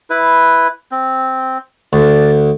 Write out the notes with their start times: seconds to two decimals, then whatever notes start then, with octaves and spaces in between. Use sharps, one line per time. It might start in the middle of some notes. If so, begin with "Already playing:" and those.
0.10 E4 B4
0.91 C4
1.93 D2 D5